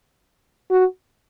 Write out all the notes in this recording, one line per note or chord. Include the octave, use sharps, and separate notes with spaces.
F#4